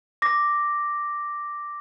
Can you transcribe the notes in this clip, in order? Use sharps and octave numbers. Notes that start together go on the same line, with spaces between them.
D6 A#6